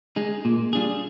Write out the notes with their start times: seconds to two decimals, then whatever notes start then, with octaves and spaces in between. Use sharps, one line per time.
0.16 G#3 D#4 G#4
0.45 A#2
0.73 G3 D4 F4 G#4